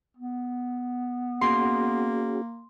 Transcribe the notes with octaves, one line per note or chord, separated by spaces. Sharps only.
B3
A#3 C#4 F#4 G#4 C6